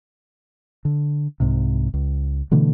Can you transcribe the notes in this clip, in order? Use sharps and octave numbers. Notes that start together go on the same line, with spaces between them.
D3
C2 G#2 C3
C#2
B2 D3 E3 A3